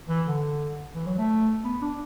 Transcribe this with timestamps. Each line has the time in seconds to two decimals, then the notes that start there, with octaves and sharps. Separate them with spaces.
0.08 E3
0.26 D3
0.95 E3
1.06 F#3
1.18 A3
1.64 B3
1.82 D4